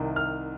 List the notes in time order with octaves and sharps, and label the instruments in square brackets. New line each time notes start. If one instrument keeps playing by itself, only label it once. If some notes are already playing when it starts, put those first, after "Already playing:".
Already playing: [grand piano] C2 C3 D#3
F6